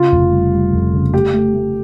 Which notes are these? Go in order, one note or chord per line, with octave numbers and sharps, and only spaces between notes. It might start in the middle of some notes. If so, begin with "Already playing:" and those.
Already playing: C#3 F4
F1
G3
G3
F2
C#3
A3 G4
A3
A3